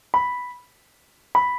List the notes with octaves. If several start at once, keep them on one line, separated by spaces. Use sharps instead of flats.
B5
B5